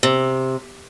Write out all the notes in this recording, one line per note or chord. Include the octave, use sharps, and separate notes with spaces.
C3